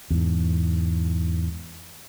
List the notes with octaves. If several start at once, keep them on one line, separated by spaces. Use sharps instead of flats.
E2 G#2